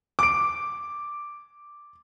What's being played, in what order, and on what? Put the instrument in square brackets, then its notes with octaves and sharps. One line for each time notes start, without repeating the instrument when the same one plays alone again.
[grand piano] D6 D7